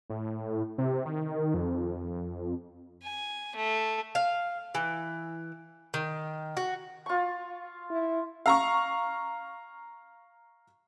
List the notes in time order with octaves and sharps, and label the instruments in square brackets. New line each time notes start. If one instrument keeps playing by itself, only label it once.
[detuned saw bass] A2
C3
D#3
F2
[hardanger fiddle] G#5
A3
[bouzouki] F5
E3
D#3
F#4
[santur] F4 C#6
[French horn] E4
[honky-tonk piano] F5 A#5 C#6